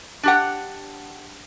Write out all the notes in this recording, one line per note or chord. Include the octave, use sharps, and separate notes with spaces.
D4 G4 F#5